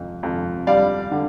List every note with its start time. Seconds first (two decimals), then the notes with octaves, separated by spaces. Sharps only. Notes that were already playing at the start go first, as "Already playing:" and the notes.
Already playing: F2
0.23 F2
0.67 G3 D5 F5
1.11 D3